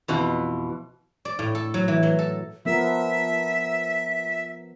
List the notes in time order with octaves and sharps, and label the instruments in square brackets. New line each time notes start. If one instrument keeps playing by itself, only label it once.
[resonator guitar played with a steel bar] F2 B2 E3
[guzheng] D5
A2
A4
F#3
E3
F#3
A4
[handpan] F3 B3 A#4 [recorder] E5